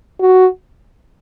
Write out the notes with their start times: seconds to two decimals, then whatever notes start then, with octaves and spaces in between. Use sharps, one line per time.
0.20 F#4